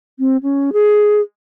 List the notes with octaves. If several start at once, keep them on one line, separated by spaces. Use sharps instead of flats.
C4
C#4
G#4